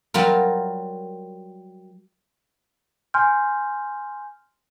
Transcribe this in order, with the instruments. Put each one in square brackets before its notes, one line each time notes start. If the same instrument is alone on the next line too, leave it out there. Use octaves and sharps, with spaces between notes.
[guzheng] F#3 G3 F4 A#4
[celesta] G#5 C6 F6 G6